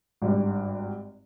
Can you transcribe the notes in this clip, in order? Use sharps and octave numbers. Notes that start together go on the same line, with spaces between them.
G#1 G2